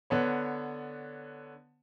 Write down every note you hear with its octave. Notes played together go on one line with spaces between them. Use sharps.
D3 B3 C#5